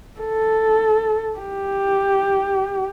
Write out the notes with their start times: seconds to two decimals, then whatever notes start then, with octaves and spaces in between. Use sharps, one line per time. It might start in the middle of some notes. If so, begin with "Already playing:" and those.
0.20 A4
1.39 G4